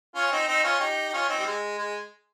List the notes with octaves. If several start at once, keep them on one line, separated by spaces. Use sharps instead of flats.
C#4 F4
C4 D#4
C4 D#4
C#4 F4
D#4 G4
D#4
C#4 F4
C4 D#4
G3
G#3
G#3